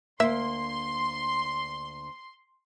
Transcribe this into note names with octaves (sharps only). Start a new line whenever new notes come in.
D2 A#3 E5 C6